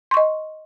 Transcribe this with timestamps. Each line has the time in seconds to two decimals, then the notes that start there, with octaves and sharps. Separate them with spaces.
0.11 C6
0.14 C#6
0.17 D#5